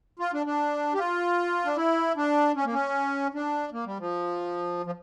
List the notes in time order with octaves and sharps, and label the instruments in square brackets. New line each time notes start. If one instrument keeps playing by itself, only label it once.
[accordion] F4
D4
D4
G4
F4
D4
E4
D4
C#4
A#3
C#4
D4
A#3
G3
F3
F3